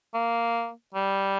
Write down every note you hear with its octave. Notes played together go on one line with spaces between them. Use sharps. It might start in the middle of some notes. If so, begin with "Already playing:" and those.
A#3
G3